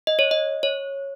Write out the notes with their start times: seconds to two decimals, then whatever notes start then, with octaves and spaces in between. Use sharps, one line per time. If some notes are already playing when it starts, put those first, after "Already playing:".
0.07 D#5
0.19 C#5
0.31 D#5
0.63 C#5